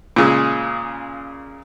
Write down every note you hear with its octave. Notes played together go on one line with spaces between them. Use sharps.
A#2 C#3 G#3